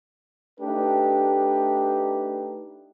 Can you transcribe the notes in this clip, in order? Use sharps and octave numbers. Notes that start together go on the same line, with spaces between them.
A3 D4 D#4 G4 B4